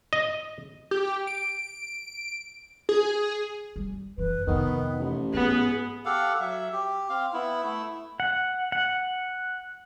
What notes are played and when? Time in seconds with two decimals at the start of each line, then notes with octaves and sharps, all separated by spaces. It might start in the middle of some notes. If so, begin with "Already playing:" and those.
0.13 D#5
0.91 G4
1.27 D7
2.89 G#4
3.76 G3
4.18 F#1 E3 B4
4.47 F2 C3 D#3 B3
5.00 A1
5.34 G#2 B3 G#4
6.05 G4 A4 F5 F#5
6.40 F#3 E5
6.73 G4
7.10 C4 F5
7.33 B3 E4
7.63 A3 E4
8.20 F#5
8.72 F#5